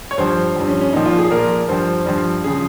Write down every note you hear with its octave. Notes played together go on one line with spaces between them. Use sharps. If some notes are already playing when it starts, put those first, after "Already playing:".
C#5
G2 F3 C5
G2 F3
C#4
C#4
A#2 F3 D#4
F4
G#4
A#2 F3 A#4
G2 F3 C5
G2 F3
C#3 F3 G#4